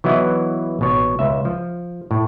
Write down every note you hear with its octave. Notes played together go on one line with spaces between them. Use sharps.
E3 F#3 B3 E4 D#5
A1 B2 C#5
C#2 E5
F3
A2